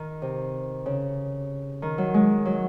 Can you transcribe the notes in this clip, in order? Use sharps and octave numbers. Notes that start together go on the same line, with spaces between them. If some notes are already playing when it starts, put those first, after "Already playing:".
Already playing: D#3
C3
C#3
D#3
F#3
G#3
F#3